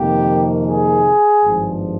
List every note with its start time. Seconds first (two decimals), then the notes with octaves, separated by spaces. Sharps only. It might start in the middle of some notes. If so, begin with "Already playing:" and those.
Already playing: F2 C3 D#3 A#3 G4
0.65 G#4
1.43 G#1 G2 F3